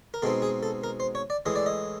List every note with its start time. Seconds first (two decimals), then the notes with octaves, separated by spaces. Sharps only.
0.14 A#4
0.22 B2 G#3 C4 D#4 A4
0.42 G#4
0.63 A4
0.84 A#4
1.00 C5
1.15 C#5
1.30 D5
1.46 A2 E3 G#3 D#5
1.56 D5
1.66 D#5